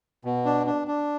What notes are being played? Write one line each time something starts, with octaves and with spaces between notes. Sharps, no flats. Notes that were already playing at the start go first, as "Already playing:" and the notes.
B2
D4
D4
D4